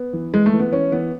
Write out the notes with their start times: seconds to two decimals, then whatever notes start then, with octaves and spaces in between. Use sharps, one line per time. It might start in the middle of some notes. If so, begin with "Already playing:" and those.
Already playing: B3
0.13 E3
0.33 E3 G#3
0.46 A3
0.53 E3
0.60 B3
0.72 E3 C#4
0.92 E3 B3